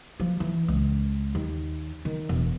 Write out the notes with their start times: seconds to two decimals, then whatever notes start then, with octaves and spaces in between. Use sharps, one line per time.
0.20 F3
0.40 E3
0.68 C#2
1.35 D#2
2.05 D#3
2.29 E1